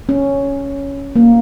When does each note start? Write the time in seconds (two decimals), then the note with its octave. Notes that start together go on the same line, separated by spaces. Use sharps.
0.09 C#4
1.16 A#3